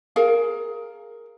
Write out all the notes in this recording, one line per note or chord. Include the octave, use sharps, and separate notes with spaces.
G#4 A#4 F5